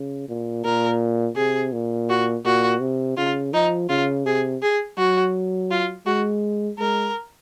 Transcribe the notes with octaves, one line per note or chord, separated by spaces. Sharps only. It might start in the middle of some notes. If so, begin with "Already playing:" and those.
Already playing: C#3
A#2
A#2 A#4
C3 G#4
A#2
F#4
A#2 F#4
C3
C#3 F4
F3 D#4
C#3 F4
C3 G#4
G#4
F#3 F#4
F4
G#3 F#4
G#3 A#4